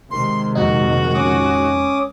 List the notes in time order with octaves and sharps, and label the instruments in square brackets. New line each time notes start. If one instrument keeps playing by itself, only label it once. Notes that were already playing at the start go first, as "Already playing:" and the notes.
[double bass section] C3 D#3 G#3 [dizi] C6
[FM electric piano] F2 A#2 D#4 [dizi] F#4
[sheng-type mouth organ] C#4 D6 D#6